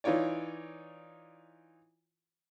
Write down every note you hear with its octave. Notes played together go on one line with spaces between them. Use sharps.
E3 D#4 F4 C#5 D5